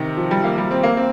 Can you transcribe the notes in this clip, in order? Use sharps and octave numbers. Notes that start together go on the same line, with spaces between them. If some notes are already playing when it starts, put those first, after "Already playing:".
Already playing: C3 D#3
F3
G3
A#3
G3
C4
A#3
C4